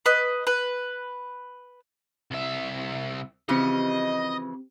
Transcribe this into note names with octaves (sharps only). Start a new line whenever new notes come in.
B4 D#5
B4
C2 E5
C#3 E3 F3 C4 G4 D#5